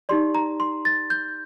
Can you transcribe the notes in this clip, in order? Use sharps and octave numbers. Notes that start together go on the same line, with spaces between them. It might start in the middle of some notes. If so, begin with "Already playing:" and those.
D#4 G4 D5 C6
A#5
C6
A6
G6